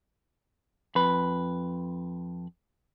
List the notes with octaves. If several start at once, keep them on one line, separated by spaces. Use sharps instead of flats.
F2 B4